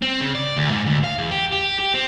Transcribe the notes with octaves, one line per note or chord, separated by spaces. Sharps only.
C4
C#3
D5
D2
G#2
D2
F5
E2
G4
G4
G4
C4